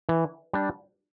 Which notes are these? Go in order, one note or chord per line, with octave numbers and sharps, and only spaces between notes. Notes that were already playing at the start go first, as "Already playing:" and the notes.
E3
G3 D4